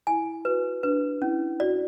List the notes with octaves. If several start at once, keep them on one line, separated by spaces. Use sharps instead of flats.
E4 G#5
F#4 B4
D4 B4
C#4 E4
F#4 D5